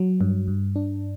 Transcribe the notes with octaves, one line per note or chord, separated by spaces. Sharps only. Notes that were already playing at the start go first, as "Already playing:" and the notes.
Already playing: F#3
G2
G2
D4